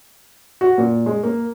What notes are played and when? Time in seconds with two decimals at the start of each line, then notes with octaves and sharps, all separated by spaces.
0.61 F#4
0.78 A#2
1.06 G#3
1.23 A#3